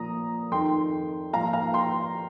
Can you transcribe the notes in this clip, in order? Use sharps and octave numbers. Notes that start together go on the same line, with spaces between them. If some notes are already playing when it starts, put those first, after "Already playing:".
Already playing: A#2 F3 A#5 D#6
F2 D#3 G5 C6
A#2 F3 F5 A#5
F5 A#5
G5 C6